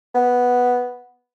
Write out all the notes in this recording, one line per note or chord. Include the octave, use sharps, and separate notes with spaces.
B3